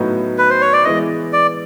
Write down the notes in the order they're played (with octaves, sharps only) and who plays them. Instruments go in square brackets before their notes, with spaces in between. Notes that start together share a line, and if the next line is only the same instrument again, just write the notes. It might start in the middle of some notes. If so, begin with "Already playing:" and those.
Already playing: [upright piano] A2 F#3 B3 D#4 F#4
[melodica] B4
C5
C#5
D5
[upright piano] E3 G#3 B3 E4 [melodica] D#5
[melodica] D5